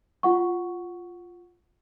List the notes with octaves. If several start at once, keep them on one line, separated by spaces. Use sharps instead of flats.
F4 F#5 C#6